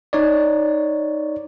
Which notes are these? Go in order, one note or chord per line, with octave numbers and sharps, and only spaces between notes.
D#4 C#5 D5